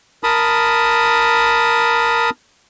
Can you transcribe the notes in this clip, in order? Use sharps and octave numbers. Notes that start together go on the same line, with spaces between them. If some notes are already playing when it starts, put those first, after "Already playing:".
A#4 A5 B5 D#6